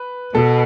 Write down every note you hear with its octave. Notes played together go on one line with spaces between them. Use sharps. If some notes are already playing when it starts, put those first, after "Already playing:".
Already playing: B4
B2 A4